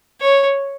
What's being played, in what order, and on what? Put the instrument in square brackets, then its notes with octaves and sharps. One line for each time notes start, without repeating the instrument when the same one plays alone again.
[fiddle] C#5